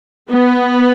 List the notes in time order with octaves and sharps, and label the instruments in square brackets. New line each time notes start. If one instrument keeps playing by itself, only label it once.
[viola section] B3